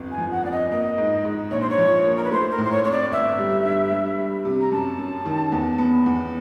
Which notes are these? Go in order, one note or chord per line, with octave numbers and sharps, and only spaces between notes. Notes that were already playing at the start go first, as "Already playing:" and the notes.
Already playing: G1 F2
G#5
F3
F#5
F2 D5
D#5
A#3 D#5
G#2
G#2
A#1 C#5
C5
C#5
F3
A#3
A#4
B4
A3 C5
A#4
A2
C5
C#5
C4 C#5
D5
G1 E5
G3
G2
G3
G3
C3
A#5
F#2 A5
F#2
D#3
E2
B3
E2